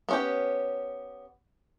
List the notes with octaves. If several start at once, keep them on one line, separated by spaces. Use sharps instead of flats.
B3 C#4 G4